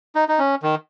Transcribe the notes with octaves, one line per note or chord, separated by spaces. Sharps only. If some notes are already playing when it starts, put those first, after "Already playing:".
D#4
D#4
C#4
D#3